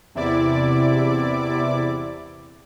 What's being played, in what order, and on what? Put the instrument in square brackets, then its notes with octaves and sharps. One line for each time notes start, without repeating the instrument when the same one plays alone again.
[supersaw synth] E2 C3 E4 D5 D6